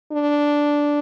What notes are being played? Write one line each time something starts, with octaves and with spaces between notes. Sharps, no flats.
D4